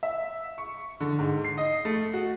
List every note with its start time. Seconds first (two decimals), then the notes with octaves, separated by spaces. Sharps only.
0.03 E5
0.58 C#6
1.00 D3
1.19 G#2
1.44 C7
1.58 D#5
1.85 A3
2.14 F#4